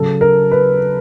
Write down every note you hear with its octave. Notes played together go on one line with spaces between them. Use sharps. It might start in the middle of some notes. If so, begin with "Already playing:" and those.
Already playing: C#3 F#3 A4
A#4
B4